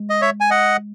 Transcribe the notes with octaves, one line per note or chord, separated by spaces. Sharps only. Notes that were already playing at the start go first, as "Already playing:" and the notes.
Already playing: G#3
D#5
C#5 E5
G#5
D#5 F#5